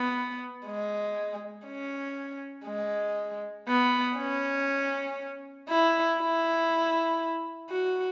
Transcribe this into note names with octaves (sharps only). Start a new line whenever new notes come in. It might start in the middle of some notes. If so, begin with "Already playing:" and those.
Already playing: B3
G#3
C#4
G#3
B3
C#4
E4
E4
F#4